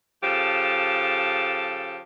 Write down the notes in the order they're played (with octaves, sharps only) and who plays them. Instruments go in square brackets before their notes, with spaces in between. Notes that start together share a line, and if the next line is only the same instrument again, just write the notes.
[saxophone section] C#3 F3 G4 A4